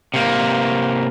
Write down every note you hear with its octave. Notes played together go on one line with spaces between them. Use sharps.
C3 A#3